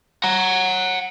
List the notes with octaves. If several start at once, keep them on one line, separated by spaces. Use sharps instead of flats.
F#5 A#5